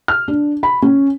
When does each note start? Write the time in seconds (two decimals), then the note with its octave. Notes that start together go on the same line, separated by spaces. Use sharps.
0.08 F6
0.28 D4
0.63 B5
0.82 C#4